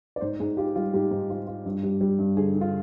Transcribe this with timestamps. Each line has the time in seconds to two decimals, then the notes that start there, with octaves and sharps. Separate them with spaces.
0.16 D5
0.21 G#2 C5
0.40 G#2 G#4
0.57 F4 G4
0.76 G3 F4
0.93 G#2 G4
1.11 G#2
1.30 F4
1.47 F4
1.66 G2
1.83 G3
2.01 G3
2.19 G2
2.37 D3 G#4
2.55 D3
2.61 F4